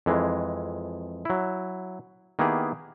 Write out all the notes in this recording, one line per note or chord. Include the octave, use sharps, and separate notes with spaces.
F2 E3 G#3
F#3 E4
D#3 A#3 B3 E4 G4 G#4